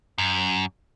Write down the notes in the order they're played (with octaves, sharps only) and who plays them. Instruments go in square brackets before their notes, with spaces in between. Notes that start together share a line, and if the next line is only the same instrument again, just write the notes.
[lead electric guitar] F#2